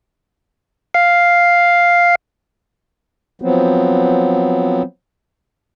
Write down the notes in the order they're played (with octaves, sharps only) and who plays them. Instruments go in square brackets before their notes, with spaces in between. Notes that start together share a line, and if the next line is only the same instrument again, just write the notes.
[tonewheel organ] F5
[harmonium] F3 F#3 B3 C4